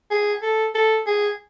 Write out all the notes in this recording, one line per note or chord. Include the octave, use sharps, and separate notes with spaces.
G#4
A4
A4
G#4